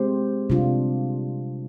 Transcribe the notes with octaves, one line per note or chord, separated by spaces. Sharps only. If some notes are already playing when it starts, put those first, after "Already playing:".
Already playing: G#3 C4 G4 C5
C3 G3 D4 F4